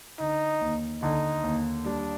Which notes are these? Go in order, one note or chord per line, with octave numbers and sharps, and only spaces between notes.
D3 D#4
D#2
D3 D#4
D#2
G3 D4